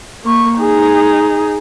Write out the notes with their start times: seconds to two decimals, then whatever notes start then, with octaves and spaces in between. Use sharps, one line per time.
0.25 A#3 C#6
0.59 D#4 G#4